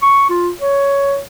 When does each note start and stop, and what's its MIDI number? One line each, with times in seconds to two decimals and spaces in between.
0.02 0.27 85
0.30 0.49 65
0.60 1.18 73